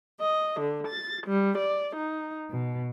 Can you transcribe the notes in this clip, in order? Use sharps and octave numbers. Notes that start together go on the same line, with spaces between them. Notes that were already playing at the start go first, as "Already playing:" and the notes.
D#5
D3
A6
G3
D5
D#4
B2